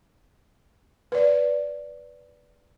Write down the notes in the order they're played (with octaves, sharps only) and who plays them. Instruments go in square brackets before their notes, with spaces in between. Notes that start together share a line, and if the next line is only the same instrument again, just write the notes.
[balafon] B4 D5